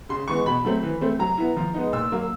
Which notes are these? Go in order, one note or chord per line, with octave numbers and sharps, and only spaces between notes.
C#3 C6
E3 G#3 B3 C#6
B2 B5
F#3 A3 C4
E3
A3 C4
F#3 A#5
B3 E4
F3
G#3 B3 D#4
A#2 E6
F#3 A#3